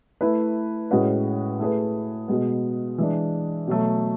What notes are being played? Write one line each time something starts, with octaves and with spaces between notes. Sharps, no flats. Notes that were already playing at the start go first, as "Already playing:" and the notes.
A3 E4 B4
A2 G#3 C#4 F#4 B4
A3 E4 G#4 B4
B2 G#3 B3
E3 G#3 D4
B2 F#3 A3